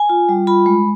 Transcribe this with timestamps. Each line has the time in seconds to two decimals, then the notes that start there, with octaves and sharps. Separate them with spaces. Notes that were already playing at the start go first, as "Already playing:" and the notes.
Already playing: G#5
0.09 F4
0.29 G3
0.47 F4 B5
0.66 G#3